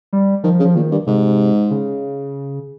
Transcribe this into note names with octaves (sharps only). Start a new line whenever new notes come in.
G3
D#3 F3
C#3
F3
A#2 D#3
G2
G#2 C3
C#3